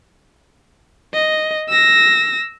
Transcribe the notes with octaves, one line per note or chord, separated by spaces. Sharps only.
D#5
E6 A#6